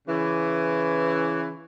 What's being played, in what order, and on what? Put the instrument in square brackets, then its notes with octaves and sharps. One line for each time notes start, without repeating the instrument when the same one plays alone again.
[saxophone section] C#3 E3